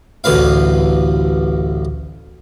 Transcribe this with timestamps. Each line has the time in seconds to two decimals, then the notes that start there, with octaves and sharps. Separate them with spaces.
0.24 A1 D2 B4 F5